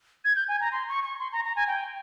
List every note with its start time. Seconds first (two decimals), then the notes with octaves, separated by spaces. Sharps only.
0.25 G#6
0.36 G6
0.48 G#5
0.61 A#5
0.72 C6
0.89 C#6
1.04 C#6
1.19 C6
1.32 A#5
1.45 A#5
1.56 G#5
1.68 G5